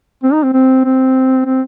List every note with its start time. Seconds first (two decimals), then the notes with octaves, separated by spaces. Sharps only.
0.24 C4
0.33 D#4
0.43 C4
0.54 C4
0.85 C4
1.46 C4